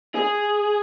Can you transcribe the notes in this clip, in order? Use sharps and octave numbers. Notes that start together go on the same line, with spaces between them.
G#4